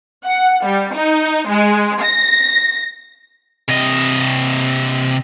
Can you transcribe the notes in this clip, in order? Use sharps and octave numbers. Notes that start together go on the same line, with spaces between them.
F#5
G3
D#4
G#3
A#6
C3 D#5